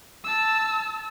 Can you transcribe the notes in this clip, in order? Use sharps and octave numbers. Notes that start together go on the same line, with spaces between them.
A5 E6